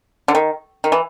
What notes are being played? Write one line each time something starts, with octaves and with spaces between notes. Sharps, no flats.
D3
D#3
D#3
E3